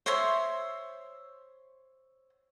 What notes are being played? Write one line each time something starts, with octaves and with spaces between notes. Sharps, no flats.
C5 C#5 E5 C6